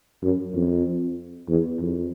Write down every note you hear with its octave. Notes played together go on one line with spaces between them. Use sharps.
F#2
F2
E2
F2